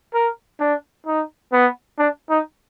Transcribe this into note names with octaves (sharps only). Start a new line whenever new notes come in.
A#4
D4
D#4
B3
D4
D#4